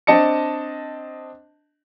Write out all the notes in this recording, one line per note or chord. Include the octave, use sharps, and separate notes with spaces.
C4 D4 D#5 A5 C#7